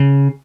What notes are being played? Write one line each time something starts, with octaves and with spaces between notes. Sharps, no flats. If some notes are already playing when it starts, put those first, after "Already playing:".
Already playing: C#3